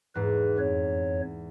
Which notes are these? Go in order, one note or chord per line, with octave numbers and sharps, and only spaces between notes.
E2 G#2 B4
F2 C#5